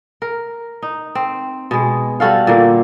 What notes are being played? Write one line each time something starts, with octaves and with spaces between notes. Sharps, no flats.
A#4
D#4
C4
B2 G#3
G3 F#4 A4 F5
A#2 D3 A#3